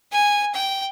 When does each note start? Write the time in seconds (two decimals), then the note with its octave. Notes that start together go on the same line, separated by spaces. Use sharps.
0.12 G#5
0.54 G5